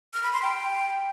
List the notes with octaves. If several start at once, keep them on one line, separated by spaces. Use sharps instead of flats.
F6
B5
C6
G5